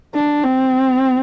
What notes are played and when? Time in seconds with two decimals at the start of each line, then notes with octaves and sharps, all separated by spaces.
0.14 D4
0.44 C4